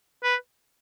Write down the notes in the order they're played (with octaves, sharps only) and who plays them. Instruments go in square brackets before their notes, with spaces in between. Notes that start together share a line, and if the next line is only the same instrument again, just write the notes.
[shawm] B4